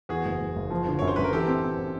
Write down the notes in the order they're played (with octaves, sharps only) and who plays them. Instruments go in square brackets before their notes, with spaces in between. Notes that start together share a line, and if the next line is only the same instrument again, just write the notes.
[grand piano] E2 [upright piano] F#4 G#4
[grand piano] F#1
F#1
F#1
F3
D3
[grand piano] F#2 [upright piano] C#5
[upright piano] C5
[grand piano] F#2 [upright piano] B4
[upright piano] A#4
[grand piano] E3 [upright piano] G4 A4
[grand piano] C4
C4
C4